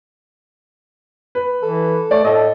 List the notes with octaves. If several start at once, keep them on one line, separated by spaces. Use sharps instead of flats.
B4
E3 A4
A3 D5
A2 A4 D#5